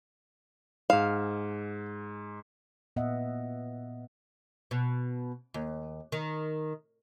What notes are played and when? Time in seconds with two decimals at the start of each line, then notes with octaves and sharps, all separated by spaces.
0.90 G#2 G#4 F5 E7
2.96 A#2 B3 D#5 E5 F#5
4.71 B2
5.54 D#2
6.12 D#3